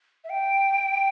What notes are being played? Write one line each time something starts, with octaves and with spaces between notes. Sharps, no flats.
E5
G5